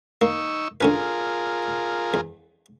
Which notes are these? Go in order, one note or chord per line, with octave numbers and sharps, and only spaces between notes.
A#3 D#4 C#6 E6
D3 C#4 F4 G#4 A#4 B4
E2